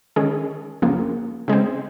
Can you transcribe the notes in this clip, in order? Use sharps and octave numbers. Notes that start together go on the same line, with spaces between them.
D#3 G#3 C#4 G#4
F2 C#3 F3 A#3
C#3 G#3 C4